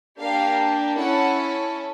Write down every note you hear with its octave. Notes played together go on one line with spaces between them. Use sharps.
A#3 D4 G4 F5
C#4 E4 A4 F#5